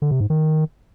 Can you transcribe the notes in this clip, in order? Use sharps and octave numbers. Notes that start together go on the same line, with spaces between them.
D3
C3
G#2
D#3